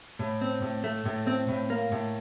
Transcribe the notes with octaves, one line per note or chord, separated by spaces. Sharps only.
A2
C4
A2
A3
A2
C4
A2
A#3
A2